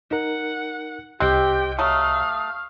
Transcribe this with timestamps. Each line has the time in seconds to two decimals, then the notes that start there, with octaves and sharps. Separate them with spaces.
0.11 D#4 A#4 F#5
1.20 C2 C4 G4 D#5 G5 F#6
1.79 F#3 A3 F5 D#6